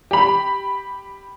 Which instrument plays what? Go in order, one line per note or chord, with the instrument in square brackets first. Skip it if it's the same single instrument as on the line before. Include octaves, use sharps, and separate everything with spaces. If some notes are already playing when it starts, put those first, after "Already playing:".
[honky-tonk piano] G4 B5